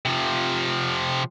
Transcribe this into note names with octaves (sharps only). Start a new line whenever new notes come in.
C3 F3